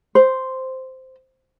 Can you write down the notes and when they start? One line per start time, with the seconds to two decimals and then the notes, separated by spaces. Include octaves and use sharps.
0.15 C5